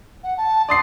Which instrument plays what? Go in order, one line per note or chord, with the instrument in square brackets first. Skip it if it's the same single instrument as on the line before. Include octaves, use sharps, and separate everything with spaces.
[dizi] F#5
A5
[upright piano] D5 D#6 C7 [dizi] C6